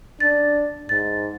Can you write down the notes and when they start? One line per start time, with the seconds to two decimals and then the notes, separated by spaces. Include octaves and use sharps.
0.20 D4 A6
0.89 G#2 A6